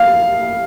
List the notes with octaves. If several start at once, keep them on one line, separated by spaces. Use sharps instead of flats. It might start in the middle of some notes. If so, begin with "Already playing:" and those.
Already playing: F5